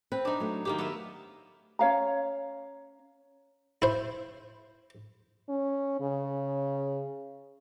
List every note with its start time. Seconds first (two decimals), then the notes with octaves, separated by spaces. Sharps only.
0.12 C4 B4
0.25 D4 D#4
0.40 F#3 A3
0.65 D#3 A#3 G4
0.78 B3 A#4 E5
1.79 C#4 C#5 F5 A#5
3.82 E4 C5
5.49 C#4
6.01 C#3